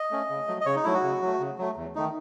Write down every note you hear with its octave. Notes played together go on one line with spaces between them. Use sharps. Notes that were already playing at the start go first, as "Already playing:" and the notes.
Already playing: D#5
A3 C#4
C#3
F#3 A3
D#5
C#3 C#5
D#4
F#3 A3 E4
F#4
C#3
F#3 A3
C#3
F#3 A3
E2
D#3 A3 D#4